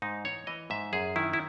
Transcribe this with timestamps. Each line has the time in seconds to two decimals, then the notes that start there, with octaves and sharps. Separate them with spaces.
0.02 G#2 D#4
0.25 E3 C#5
0.47 E3 D#5
0.70 G#2 E5
0.93 F#2 G#4
1.16 D#3 E4
1.33 E4